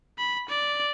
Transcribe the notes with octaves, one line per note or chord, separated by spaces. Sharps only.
B5
D5